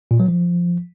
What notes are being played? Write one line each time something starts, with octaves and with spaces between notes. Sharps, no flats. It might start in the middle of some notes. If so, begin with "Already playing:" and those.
A#2
F#3
F3